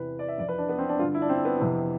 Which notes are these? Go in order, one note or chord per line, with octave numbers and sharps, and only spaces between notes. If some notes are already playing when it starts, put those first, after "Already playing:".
Already playing: E2 C3 E3 B4
D5
E5
F2 E3 D5
B4
D4
B3
C4
D4
G2 D3 F4
E4
D4
C4
B3
F2 C3 E3